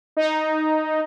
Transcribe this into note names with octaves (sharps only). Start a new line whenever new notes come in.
D#4